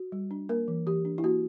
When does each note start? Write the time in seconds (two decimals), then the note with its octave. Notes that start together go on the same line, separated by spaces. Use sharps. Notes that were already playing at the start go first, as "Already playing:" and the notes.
Already playing: F#4
0.12 G3
0.31 D4
0.49 A#3 A#4
0.68 E3
0.87 E3 G4
1.05 D4
1.18 E4
1.24 A#3 F#4